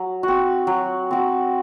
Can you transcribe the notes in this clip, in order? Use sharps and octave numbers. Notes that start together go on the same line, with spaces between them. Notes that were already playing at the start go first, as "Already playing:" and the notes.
Already playing: F#3
C4 F#4
F#3
C4 F#4